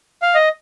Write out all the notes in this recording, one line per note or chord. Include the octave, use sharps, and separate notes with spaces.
F5
D#5